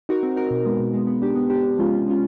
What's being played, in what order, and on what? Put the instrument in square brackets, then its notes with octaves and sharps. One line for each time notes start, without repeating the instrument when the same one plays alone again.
[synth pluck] D#4 F#4 A#4
C4
D#4 F#4 A#4
B2
G#3 B3
B2
G#3 B3
B3
D4 G4
B3
D4 G4
C3
F3 G#3 C#4 F4
C3
F3 G#3 C#4 F4